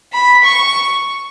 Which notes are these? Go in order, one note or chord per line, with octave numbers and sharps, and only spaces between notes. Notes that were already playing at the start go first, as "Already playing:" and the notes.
B5
C#6